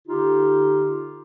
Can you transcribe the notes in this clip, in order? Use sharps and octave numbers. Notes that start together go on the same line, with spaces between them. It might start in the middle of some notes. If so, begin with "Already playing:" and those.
D3 D#4 F4 G4